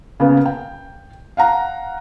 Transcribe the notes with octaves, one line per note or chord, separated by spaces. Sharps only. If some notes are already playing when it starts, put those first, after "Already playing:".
C#3 A#3 B3 C#4
G5
F5 F#5 A#5